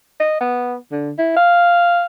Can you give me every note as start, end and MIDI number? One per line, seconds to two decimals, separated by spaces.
0.20 0.38 75
0.41 0.76 59
0.92 1.11 50
1.18 1.34 64
1.37 2.06 77